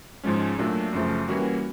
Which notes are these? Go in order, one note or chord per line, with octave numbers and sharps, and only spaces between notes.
G#2 F3 G#3 C#4
A#2 F#3 A3 D4
F#2 C#3 F3 A3
E3 G3 A#3 C#4 F#4